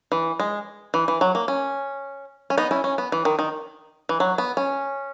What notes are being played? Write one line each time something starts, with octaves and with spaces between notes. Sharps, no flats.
E3
G#3
E3
E3
F#3
A#3
C#4
C#4
B3 D#4
C#4 E4
C#4
B3
E3
D#3
D#3
E3
F#3
B3
C#4